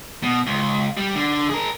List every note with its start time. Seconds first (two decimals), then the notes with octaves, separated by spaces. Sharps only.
0.23 B2
0.47 C#2
0.97 G3
1.15 D3
1.50 G#4 A#4